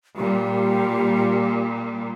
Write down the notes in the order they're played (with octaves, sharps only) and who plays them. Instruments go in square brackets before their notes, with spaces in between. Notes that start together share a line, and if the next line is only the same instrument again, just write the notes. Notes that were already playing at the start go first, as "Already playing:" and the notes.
[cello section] A#2 G3 [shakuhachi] G4